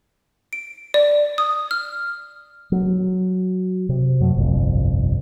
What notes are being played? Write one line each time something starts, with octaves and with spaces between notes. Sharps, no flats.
D7
D5
D#6
F6
F#3
C3
F#2 F#3 A3
G1 C2 F2